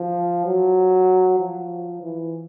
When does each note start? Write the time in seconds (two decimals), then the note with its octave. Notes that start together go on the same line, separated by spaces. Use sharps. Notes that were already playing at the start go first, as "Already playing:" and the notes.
Already playing: F3
0.46 F#3
1.39 F3
2.02 E3